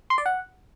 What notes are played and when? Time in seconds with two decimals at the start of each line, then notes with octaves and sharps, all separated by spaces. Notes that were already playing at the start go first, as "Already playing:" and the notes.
0.10 C6
0.18 D5
0.26 F#5